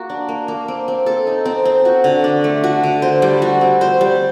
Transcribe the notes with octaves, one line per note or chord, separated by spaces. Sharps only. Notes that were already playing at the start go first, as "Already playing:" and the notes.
Already playing: A#3 F#4
D4
A#3
A#3
C4
C4
A4
D#4
C4
C4
F#4
D3
D4
A3
F#4
D3
C5
G3
F#4
C4
C5
G3